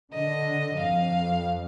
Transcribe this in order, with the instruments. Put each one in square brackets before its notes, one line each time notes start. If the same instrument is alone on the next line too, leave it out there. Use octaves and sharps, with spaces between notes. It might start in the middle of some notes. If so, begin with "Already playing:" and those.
[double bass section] D3 [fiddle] D#5
[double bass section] F2 [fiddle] F5